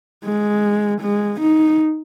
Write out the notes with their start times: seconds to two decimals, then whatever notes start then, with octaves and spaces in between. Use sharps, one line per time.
0.24 G#3
1.02 G#3
1.41 D#4